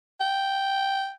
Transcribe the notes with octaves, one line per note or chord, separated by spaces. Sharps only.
G5